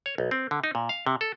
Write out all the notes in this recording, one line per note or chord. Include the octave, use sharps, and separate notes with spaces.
C#5
B1
C4
D3
D#4
A#2
F5
C3
A4